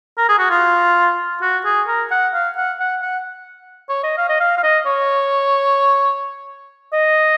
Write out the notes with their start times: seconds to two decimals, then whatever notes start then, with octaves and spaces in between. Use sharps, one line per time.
0.18 A#4
0.29 G#4
0.39 F#4
0.50 F4
1.42 F#4
1.65 G#4
1.88 A#4
2.11 F#5
2.34 F5
2.57 F#5
2.80 F#5
3.02 F#5
3.89 C#5
4.03 D#5
4.17 F5
4.29 D#5
4.40 F5
4.57 F5
4.63 D#5
4.86 C#5
6.93 D#5